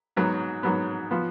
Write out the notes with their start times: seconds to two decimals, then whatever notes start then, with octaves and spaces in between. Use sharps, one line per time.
0.17 G#2 F#3 B3
0.63 G#2 F#3 B3
1.11 F3 B3